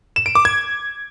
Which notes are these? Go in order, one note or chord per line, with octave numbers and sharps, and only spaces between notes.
E7
D7
D6
G#6